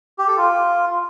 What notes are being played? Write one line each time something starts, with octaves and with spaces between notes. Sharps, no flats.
G4
A4
F4